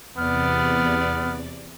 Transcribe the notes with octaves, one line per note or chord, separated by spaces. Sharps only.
E2 C3 B3 D5 F6